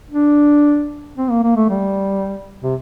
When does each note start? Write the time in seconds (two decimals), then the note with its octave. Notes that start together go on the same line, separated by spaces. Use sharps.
0.11 D4
1.17 C4
1.30 A#3
1.43 A#3
1.56 A3
1.70 G3
2.63 C3